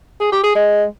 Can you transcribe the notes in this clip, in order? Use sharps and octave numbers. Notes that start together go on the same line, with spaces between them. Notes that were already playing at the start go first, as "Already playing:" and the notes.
G#4
G4
G#4
G#3